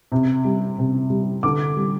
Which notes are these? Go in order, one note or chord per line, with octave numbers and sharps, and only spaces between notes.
C3
G3
C3
G3
D3 D6
G3